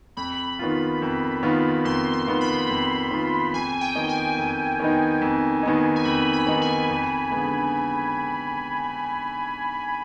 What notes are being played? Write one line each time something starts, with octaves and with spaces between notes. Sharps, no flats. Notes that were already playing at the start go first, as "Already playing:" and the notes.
F2 B5
D#3 B3 F4
F2
D#3 B3 F4
F2 C6
C6
D#3 B3 F4
B5
F2
D#3 B3 F4
F2 G#5
G5
D#3 B3 D#4
G#5
F2
D#3 B3 D#4
F2
D#3 B3 D#4
G#5
F2 B5
B5
D#3 B3 D#4
G#5
F2
D3 G#3 B3